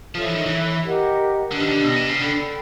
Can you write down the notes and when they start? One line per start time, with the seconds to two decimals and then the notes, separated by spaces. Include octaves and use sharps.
0.15 F3 A4 C#5 E5
0.26 E3
0.36 D#3
0.46 E3
0.84 G4 A#4 D#5 F#5
1.52 D3 D4 G4 B4 D#5
1.60 D#3
1.68 D3
1.84 B2
1.96 C3
2.08 C#3
2.20 D3 A4 D5 G5 B5